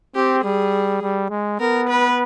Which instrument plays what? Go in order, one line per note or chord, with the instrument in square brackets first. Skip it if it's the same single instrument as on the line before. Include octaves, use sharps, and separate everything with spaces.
[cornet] C4 [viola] G4
[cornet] G3 [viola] G#4
[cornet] G3
G#3
[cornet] B3 [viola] A#4
[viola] B4